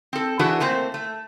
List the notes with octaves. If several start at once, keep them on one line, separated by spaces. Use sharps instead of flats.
C4 A4
E3 D4 E4 F#4 G#4 B4
A3 A#3 C4 C5
A3